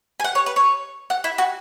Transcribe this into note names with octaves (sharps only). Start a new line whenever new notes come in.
G#5
F#5
C#5
B4
C#5
F#5
E4
F#4